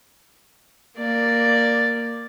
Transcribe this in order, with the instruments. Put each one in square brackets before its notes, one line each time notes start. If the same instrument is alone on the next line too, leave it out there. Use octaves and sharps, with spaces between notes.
[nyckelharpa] A#3 D5